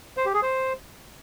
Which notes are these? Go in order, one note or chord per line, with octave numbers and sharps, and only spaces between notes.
C5
G4
G#4
C5